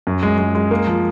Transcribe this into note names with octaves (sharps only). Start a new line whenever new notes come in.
F#2
G#3
G#3
G#3
A#3
F3